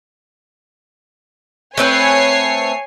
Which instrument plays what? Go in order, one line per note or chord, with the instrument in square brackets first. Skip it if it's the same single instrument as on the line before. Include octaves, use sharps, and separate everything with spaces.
[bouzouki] A3 C4 B4 [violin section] C#5 G#5 C7